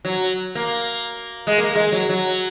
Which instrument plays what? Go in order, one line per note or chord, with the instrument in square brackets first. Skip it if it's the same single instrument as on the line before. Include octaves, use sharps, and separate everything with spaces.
[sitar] F#3
A#3
G#3
A#3
G#3
F#3
F#3